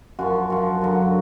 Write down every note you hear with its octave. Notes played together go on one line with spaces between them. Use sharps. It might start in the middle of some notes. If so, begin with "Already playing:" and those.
F#2 F3 F#4
F#2 F3 F#4
F#2 D3 F#3